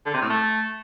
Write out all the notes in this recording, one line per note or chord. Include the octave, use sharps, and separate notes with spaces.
D3
C3
A2
A3